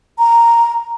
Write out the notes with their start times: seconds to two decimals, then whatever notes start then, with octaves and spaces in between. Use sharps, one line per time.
0.18 A#5